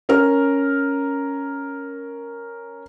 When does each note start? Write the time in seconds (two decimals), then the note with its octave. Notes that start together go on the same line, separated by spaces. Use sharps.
0.09 C#4 A#4 F6